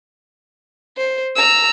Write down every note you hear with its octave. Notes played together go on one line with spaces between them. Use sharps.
C5
A#5 E6